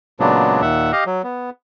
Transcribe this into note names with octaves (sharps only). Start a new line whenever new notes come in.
A#2 C#3 F#3 G#3 B3 D4
D#2 A#2 E5 F#5
G4 D#5 F5
F#3
B3